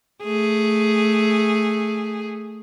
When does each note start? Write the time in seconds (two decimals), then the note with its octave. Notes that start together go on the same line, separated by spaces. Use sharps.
0.24 A3 G#4